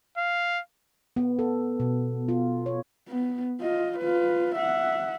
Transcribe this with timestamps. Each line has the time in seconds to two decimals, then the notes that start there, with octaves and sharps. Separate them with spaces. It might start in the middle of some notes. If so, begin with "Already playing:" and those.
0.18 F5
1.16 B3
1.39 A4
1.80 B2
2.29 F4
2.66 C#5
3.08 B3
3.60 F4 D#5
3.98 F4 B4
4.55 E5 F#5